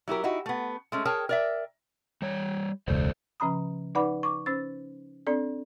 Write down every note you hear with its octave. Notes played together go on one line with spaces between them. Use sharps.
F#3 E4 G4 A#4
D#4 E4 F#4
A3 B3
G#3 A3 C#4
G#4 A#4 C#5 G5 A5
A#4 D5 E5
G3 C#5
E1 C#2 A4 C5 D5
C#3 F3 C#4 A#5 B5 D#6
D#4 B4 D5 F#5 B5 D6
C#6 D6
C#4 C5 E6 A6
C4 D4 A4 D5